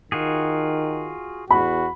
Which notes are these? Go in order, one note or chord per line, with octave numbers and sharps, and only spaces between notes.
D#3 F4 F#4 G#4
E2 F#4 B5